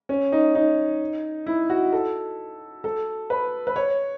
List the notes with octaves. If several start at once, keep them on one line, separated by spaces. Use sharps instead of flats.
C#4
D#4
D#4
E4
F#4
A4
A4
B4
B4
C#5